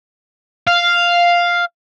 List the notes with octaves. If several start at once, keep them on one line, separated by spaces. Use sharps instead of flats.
F5